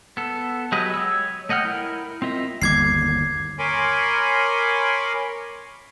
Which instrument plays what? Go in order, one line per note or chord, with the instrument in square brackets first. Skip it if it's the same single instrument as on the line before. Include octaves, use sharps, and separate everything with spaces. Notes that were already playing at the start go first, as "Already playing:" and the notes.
[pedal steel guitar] B3 A4
F#3 G#3 G4 B4 D#5
C#5 E6
A3 D#5 F#5 G5 F6
E4 A#4
C4 F4 D#5 E5
[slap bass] G1 D#2 [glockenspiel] D6 G#6 C7
[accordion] A#4 C#5 G#5 B5 C6 D6